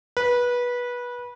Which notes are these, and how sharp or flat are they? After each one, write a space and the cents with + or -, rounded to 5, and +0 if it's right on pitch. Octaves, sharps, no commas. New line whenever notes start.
B4 -20